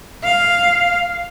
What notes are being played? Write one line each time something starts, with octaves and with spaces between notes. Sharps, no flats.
F5